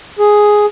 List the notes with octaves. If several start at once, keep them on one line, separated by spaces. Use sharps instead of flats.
G#4